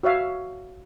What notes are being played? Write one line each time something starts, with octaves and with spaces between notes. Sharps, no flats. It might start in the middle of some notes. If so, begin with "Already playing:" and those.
F#4 C#5 E5 F5